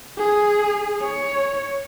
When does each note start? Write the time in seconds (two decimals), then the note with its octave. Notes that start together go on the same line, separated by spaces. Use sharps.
0.17 G#4
1.02 C#5